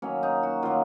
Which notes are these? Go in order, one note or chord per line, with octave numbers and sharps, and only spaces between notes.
D#3 F#3 A#3 C#4
D#4
F#4
D#3 F#3 A#3 F4